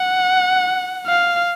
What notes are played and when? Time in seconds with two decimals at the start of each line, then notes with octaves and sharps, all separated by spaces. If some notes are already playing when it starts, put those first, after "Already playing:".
Already playing: F#5
1.07 F5